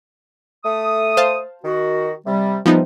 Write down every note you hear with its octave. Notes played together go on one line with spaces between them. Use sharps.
A3 D#6
C5 F5 A5
D#3 F#4
C3 G3
C3 F3 G3 B3 D#4